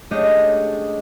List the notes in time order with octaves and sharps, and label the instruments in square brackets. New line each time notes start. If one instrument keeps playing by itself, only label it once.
[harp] G#3 A3 C#4 D4 G4 D#5